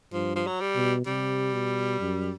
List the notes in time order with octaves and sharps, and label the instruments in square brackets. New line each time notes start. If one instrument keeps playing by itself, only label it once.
[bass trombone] G2 [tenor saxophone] F3
[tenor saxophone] F3
F#3
G3
[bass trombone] B2
[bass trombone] C3 [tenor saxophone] G3
[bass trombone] B2
F#2